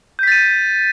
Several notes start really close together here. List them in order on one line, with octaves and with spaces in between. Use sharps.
G6 B6 A6 D#7